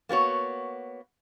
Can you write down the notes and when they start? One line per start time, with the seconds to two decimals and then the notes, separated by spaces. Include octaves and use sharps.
0.09 A#3 B3 F#4 C#5